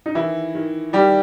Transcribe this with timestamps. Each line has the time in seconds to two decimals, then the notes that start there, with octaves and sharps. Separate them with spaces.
0.06 D#4
0.15 D#3 E3 E4
0.55 D#3
0.93 D#3 G3 G4